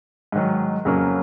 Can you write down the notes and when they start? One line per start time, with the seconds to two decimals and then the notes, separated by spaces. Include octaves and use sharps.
0.32 G#2 D#3 F#3
0.85 F2 C#3 F#3 A#3 C#4